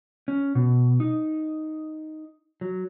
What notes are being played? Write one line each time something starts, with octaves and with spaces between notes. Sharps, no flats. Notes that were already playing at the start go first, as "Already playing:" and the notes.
C#4
B2
D#4
F#3